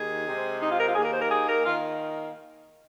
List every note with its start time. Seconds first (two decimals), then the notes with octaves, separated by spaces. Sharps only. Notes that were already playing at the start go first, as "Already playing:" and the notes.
Already playing: D#2 D#3 G#4
0.27 C3 G#3 C4
0.60 D#4
0.69 F4
0.77 A#4
0.86 F4
0.95 D#2 D#3 A#3 G#4
1.03 A#4
1.12 C5
1.20 A#4
1.29 G#4
1.46 A#4
1.63 D#3 A#3 F4